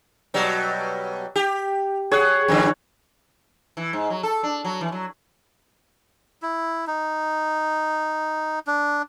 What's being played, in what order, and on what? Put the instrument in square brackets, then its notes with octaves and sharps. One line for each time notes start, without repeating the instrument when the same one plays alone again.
[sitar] B2 F#3 G3
G4
[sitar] G#4 [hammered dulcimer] C#5 F#5
[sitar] F2 D3 E3
E3
G#2
F#3
A4
D4
F#3
E3
F#3
[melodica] E4
D#4
D4